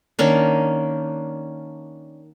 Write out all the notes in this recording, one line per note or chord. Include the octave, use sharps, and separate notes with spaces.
D#3 A#3 C#4 D4